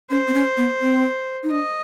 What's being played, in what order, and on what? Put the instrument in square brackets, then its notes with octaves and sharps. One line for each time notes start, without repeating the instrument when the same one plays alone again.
[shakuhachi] C#4 [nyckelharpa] C5
[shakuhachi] C4
C#4
B3
C4
D#4
[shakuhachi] D4 [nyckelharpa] D#5